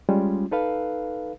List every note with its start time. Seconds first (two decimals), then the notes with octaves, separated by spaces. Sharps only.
0.09 G3 G#3 C#4 F4
0.51 D#4 A4 B4 F5